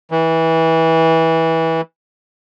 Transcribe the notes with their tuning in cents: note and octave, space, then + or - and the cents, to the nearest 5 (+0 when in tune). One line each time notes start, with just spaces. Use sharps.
E3 -20